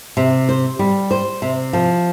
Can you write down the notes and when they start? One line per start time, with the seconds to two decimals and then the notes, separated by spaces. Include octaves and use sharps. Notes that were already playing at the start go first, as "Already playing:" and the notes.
0.17 C3
0.49 C5
0.79 G3
1.11 C5
1.42 C3
1.73 F3